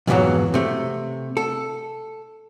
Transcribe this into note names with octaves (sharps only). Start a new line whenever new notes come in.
F2 G#2 B2 D#3 E3 F#3
C3 A3
A4